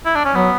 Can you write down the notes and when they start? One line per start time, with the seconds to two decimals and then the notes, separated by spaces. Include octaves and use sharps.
0.05 E4
0.15 D4
0.25 C#4
0.34 F#3 B3